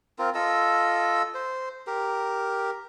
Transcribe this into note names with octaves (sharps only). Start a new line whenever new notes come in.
C4 F4 A#4
F4 A4 D#5 E6
C5
G4 A#4